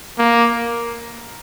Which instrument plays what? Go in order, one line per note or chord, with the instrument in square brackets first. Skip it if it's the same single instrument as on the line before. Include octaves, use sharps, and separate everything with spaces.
[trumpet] A#3